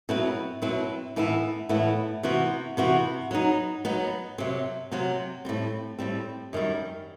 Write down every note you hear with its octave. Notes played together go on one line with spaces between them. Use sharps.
B2 F#3 C4 E4 B4
B2 F#3 C4 E4 B4
A2 E3 B3 E4
A2 E3 B3 E4
C3 E3 B3 F#4
C3 E3 B3 F#4
F#3 B3 D#4
F#3 B3 D#4
C3 F#3 C4
C3 F#3 C4
A2 G3 C4
A2 G3 C4
F#2 D#3 G3